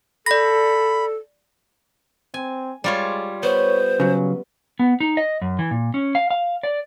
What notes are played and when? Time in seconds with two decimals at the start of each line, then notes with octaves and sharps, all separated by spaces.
0.26 A4 D5 B5 A#6
2.34 C4 G#5
2.84 G3 G#3 F4 C#5
3.43 B3 C5 C#5
4.00 C#3 F#3 C#4
4.79 B3
5.00 D#4
5.17 D#5
5.42 F#2
5.59 E3
5.71 A#2
5.94 C#4
6.15 F5
6.31 F5
6.63 D5